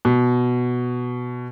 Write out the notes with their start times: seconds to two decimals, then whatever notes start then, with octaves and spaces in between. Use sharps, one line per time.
0.05 B2